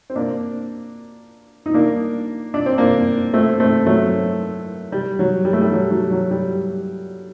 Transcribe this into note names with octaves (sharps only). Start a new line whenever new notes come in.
C4
A#3 D4
D#4
A#3 D4
D4
C4
A#3 D4
A3 C4
A3 C4
F#3 A3
G3
F#3
G3
A3
G3
F#3
F#3
F#3
G3